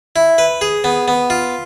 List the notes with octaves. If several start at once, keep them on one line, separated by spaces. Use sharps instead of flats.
E4
B4
G#4
B3
B3
F4